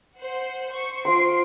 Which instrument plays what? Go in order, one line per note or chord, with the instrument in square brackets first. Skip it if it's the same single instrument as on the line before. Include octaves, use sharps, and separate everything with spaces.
[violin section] C5 F#5
C5 C#6
[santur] F4 C5 C6 [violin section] C7 D7